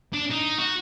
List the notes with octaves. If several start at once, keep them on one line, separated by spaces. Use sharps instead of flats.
D4
D#4
F#4